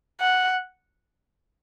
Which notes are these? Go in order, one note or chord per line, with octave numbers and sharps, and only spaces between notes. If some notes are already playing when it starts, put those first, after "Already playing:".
F#5